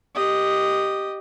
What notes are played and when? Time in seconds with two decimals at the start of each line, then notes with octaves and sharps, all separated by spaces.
0.15 G4 D#5